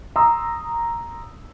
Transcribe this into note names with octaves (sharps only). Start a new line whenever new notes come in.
A#5 C6 D#6 E6